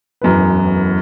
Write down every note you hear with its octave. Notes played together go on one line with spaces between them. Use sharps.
E1 F#2 A2 B4